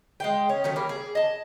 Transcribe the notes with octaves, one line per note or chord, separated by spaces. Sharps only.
G#3 F5 G5
C#4
D#3 F#3 A3 C#4
G3 A#3
G#4
D#5 A5